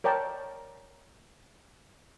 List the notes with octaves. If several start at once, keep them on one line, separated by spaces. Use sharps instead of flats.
A#4 C#5 D5 G5 A5